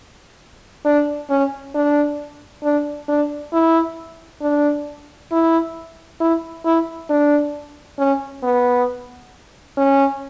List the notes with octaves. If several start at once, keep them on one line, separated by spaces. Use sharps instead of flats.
D4
C#4
D4
D4
D4
E4
D4
E4
E4
E4
D4
C#4
B3
C#4